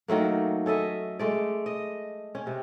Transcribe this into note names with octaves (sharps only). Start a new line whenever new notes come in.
D#3 F#3 A3 A#3
C#4 A4 D#5 E5
G#3 A3 D5
D#5
C#4
C3